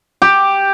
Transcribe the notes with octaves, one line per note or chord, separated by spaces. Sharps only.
G4